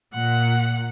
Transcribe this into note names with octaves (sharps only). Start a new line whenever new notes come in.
A#2 F#5